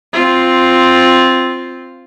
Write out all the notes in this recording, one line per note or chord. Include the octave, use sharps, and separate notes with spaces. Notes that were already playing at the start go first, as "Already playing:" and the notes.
C4 F4